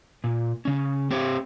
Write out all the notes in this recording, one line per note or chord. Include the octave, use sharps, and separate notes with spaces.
A#2
C#3 C#4
C4 G4 C5 C#5